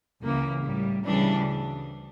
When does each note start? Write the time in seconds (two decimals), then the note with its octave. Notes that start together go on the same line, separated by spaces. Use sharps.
0.20 C#2 C#3 E3 A#3
0.62 A2 G3
1.05 D2 C#3 E3 G3 D4